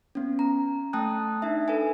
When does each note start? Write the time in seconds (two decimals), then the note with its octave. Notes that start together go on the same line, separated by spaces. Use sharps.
0.15 B3 C#4
0.39 A#5
0.93 A3 G5 A5 D#6 F#6
1.42 D4 D#4 E5
1.68 A4 B4 E5 G#5